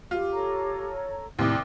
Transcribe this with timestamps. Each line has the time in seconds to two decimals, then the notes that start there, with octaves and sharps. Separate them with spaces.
0.11 F4 G4
0.32 A4 C#5 A#5
1.39 D#2 A2 C3 E4 D5 D6 D#6